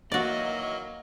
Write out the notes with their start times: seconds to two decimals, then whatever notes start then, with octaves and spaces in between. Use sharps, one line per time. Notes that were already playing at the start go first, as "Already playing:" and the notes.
0.12 D#3 E3 F#3 A#3 F#4 D5 D#5